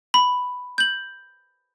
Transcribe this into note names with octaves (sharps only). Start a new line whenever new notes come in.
B5
G6 F#7